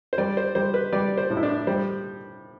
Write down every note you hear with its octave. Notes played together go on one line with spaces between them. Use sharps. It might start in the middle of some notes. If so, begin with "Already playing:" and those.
C5
G3 D5
C5
G3 C5
B4
G3 D5
C5
A2
E4
D4
G3 C5